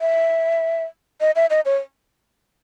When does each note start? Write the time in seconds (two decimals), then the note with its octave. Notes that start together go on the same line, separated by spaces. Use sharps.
0.01 E5
1.21 D#5
1.36 E5
1.50 D#5
1.65 C#5